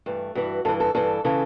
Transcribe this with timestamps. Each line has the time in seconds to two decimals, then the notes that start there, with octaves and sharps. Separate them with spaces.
0.06 G2 E3 A3
0.35 G2 E3 F#4
0.65 G2 A4
0.68 E3
0.80 A4
0.95 G2 E3 A4
1.25 C#3 E3 A4